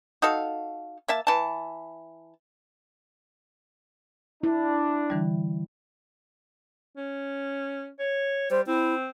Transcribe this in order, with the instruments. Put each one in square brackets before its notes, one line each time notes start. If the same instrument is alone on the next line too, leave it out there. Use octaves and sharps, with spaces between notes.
[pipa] D#4 F#4 A4 F5
A#3 E5 A5
E3 A5
[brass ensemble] D4 [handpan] E4
[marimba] D3 E3 G3
[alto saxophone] C#4
C#5
[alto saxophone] G3 [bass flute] C5
[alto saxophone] C4 [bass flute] E4